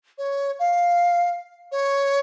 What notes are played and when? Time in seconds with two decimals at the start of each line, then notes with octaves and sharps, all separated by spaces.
0.18 C#5
0.59 F5
1.71 C#5